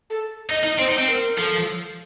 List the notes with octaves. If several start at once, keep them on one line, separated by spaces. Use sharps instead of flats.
A4
D#4 D#5
D#4
C4 C5
D#4
C4
A#4
F3 A4